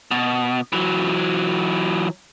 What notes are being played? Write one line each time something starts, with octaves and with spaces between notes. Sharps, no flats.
B2
E3 F#3